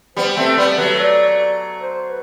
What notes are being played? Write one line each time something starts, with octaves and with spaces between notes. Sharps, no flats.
G3 B3 C5
A3 C4 E5
G3 B3 D5
F#3 A3 B4
D5
C5
B4